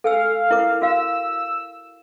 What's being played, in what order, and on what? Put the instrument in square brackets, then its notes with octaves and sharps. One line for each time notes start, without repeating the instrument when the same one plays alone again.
[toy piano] A4 G#5 E6 [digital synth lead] F5
[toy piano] E4 A#4 D6
[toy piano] F#4 F5 [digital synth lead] E6